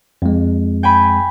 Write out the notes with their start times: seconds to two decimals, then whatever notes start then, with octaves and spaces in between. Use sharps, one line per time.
0.22 F2 G#3
0.83 G5 G#5 B5